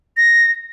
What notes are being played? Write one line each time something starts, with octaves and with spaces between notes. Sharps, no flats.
A#6